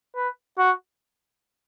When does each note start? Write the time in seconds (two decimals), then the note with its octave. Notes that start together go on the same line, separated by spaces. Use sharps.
0.16 B4
0.58 F#4